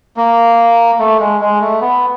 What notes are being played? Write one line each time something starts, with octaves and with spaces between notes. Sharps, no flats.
A#3
A3
G#3
G#3
A3
B3